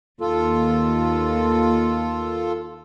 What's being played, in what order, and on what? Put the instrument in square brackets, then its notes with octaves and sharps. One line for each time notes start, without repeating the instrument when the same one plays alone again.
[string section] D#2 [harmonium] F4 A4